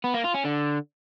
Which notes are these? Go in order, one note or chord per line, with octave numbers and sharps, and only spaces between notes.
B3
A#3
F4
C#4
D3